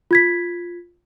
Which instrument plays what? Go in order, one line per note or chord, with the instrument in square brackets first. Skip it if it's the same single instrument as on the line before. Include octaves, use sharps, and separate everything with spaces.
[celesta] F4 G#6 B6